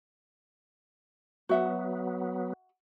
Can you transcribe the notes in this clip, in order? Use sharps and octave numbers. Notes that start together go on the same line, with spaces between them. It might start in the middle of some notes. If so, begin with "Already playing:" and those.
F#3 B3 F#4 E5 F#5